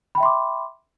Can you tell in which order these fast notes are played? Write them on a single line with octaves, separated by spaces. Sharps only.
B5 G5 E5 C6 D6